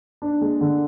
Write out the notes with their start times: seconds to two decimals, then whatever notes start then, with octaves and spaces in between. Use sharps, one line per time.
0.22 D4
0.41 G#3
0.61 D3